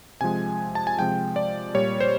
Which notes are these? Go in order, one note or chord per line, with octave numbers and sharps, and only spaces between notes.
C3 F3 G#3 G#5
A5
G#5
C3 F3 G#3 G5
D5
A#2 G3 C#5
C5